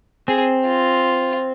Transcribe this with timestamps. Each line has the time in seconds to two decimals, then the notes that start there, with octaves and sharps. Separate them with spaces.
0.28 C4 G#4
0.66 F4